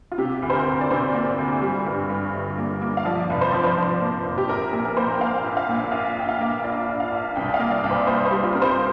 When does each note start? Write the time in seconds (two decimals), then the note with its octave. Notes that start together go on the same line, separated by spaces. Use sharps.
0.12 F4
0.18 C3 G4
0.42 D2
0.50 C5
0.54 A#4
0.66 D2
0.81 D5
0.91 C3 C5
1.14 A#3
1.38 D2
1.62 G3
1.86 G2
2.10 G2
2.33 G1
2.58 A#3
2.81 A#3
2.97 F5
3.05 F3 D5
3.30 F1
3.41 C5
3.52 F3 D5
3.64 C5
3.77 F3
4.00 A#3
4.25 F1
4.38 G4
4.48 A#1 A#4
4.73 A#2
4.85 A#4
4.97 A#2 C5
5.08 A#4
5.15 G5
5.21 A#3 F5
5.44 A#1
5.57 F5
5.69 A#2
5.92 A#1 F5
6.16 A#1 G5
6.29 F5
6.40 A#3
6.64 A#1 D5
6.88 A#1
7.00 F5
7.12 A#1
7.35 C2 G5
7.48 D5
7.54 F5
7.59 A#3
7.71 D5
7.84 C2
7.90 C5
8.07 A#3 C5
8.25 C5
8.31 G3
8.44 F4
8.55 C3 A#4
8.62 C5